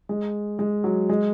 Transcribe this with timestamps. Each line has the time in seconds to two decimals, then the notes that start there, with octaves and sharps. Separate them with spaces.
0.09 G#3
0.59 G#3
0.84 F#3
1.09 G#3